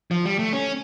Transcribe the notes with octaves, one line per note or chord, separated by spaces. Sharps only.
F3
G3
A3
C#4